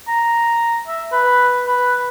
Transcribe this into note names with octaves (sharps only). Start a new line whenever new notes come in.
A#5
E5
B4
B4